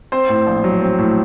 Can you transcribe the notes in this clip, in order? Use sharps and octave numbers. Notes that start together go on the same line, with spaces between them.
C4 C5
A2
A#1
F#3
C4
A2